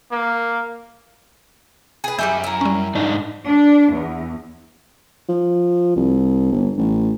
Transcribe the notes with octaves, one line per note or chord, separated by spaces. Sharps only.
A#3
G#4 B4
F#2 G3 D#4 E5 G#5 G6
E4 A#4
G3 C#4
G#2 D4 D#4
D4
E2
F3
C2
G1
A1